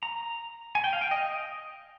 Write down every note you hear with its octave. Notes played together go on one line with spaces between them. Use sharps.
A#5
G#5
G5
F5
G5
D#5